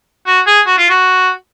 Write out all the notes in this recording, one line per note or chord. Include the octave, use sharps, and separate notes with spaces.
F#4
G#4
F#4
F4
F#4